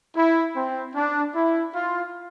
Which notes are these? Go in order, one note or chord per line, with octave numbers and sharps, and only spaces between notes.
E4
C4
D4
E4
F4